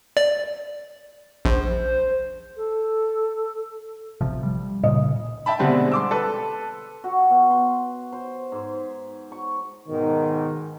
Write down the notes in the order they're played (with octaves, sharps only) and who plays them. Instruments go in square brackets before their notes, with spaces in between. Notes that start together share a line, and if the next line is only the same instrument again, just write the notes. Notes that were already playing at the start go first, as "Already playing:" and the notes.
[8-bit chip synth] D5
[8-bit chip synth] A#1 [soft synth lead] C5
[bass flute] A4
[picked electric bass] A#1 C3 F3
G3
[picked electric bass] A#2 C#3 [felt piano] D#5
[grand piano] E5 G5 A5 B5
B2 D3 G3 G#3 C4
C6 D6 E6
A4 B4
[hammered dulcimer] F#4
B2
C6
C5
G#2
C#6
[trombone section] G#2 B2 D#3